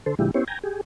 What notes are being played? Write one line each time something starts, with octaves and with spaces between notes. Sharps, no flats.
D3 A4 C5
A#2 D3 F3 G#3 E4 G4
B3 C#4 E4 G4 C5 C#5
G5 G#5 A#5
G4 G#4